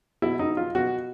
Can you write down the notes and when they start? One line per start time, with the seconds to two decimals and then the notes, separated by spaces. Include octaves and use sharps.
0.22 B2 E4
0.39 D#4
0.57 F4
0.75 B2 F#4